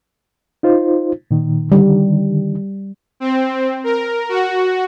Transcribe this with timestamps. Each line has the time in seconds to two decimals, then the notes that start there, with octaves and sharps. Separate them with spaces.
0.63 D#4 F4 C5
1.31 A#2 D#3
1.72 D3 D#3 G3
3.20 C4
3.84 A#4
4.29 F#4